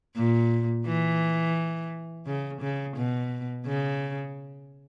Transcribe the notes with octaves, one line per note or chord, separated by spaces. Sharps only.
A#2
E3
C#3
C#3
B2
C#3